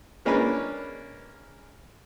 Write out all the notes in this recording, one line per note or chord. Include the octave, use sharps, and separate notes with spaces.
G#3 A#3 C#4 D4 B4